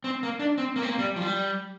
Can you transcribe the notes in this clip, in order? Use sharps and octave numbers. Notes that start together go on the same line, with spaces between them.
C4
A#3
D4
C4
A#3
C4
A#3
G3
F3
G3